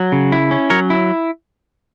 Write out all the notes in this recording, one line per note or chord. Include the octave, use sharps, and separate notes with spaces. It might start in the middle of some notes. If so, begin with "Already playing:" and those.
Already playing: F#3
C#3
E4
C#4
F#3 A#4 C#5
E4